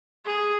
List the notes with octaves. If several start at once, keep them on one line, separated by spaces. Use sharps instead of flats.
G#4